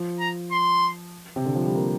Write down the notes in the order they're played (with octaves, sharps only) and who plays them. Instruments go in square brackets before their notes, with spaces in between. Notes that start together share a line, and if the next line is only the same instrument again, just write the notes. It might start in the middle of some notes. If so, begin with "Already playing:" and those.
Already playing: [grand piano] F3
[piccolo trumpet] A#5
C6
[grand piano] C3
D3
F3
G3
A#3